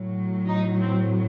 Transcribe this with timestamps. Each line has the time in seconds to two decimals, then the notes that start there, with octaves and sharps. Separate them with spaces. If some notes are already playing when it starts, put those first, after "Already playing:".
Already playing: A2 F#3
0.48 D#4
0.81 C4